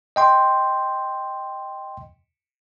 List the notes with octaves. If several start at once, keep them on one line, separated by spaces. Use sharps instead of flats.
D#5 G5 C6